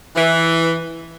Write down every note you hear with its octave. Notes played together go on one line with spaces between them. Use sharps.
E3